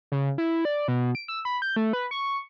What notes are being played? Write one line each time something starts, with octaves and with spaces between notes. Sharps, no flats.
C#3
E4
D5
B2
D7
E6
B5
G6
A3
B4
C#6